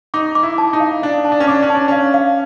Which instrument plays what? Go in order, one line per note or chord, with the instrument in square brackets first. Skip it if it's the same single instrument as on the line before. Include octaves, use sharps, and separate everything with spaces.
[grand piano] D#4 [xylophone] D6
[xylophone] D6
[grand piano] E4
[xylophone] A5
[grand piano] D#4
[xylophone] F5
[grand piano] D4 [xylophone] F5
[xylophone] A5
[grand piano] D4
C#4
[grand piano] D4 [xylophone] D6
[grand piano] C#4
[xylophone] A5
[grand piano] D4
[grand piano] C#4 [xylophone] F5
[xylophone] F5